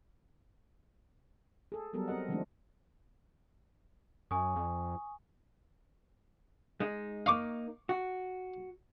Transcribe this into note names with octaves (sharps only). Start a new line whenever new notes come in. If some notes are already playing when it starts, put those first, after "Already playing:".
G#4 A4
F#3 G3 B3 A4 A#4
C4 A#4 D#5 F#5
D#3 F3 G#3 A3 C4 D4
F#2 G#5 C#6 D#6
F2
G#3 D#4
A#3 D#4 F5 C#6 D6
F#4